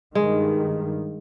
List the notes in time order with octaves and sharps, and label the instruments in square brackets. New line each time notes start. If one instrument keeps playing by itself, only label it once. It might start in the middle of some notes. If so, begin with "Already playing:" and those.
[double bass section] G2 D#3 [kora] G#3